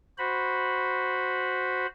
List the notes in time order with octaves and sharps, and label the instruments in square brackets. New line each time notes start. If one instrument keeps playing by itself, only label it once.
[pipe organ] F#4 C5 B5